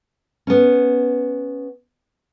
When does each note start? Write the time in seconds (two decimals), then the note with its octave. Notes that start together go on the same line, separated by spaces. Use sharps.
0.47 B3 C#4